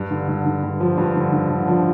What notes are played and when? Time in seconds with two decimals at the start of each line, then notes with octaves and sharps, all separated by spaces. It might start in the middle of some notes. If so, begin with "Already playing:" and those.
Already playing: G2
0.11 D3
0.28 D3
0.46 D3
0.63 G2
0.80 F3
0.97 G2
1.15 D3
1.32 D3
1.50 D3
1.67 F3